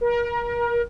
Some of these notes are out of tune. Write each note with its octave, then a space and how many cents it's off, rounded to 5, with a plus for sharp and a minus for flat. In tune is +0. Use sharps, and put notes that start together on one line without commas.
A#4 +30